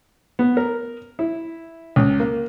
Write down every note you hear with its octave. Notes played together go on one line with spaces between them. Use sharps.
B3
A#4
E4
C#2
A#3